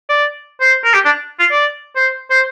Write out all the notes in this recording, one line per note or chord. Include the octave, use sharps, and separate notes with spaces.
D5
C5
A#4
G4
D4
F4
D5
C5
C5